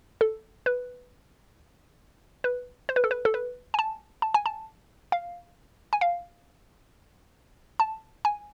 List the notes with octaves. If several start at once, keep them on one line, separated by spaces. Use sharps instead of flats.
A4
B4
B4
C5
B4
A4
B4
A4
B4
G#5
A5
A5
G#5
A5
F5
G#5
F5
A5
G#5